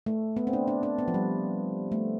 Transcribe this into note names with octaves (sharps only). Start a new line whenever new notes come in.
A3
B3
C4
D4
D4
D4
B3
F3
G3
A3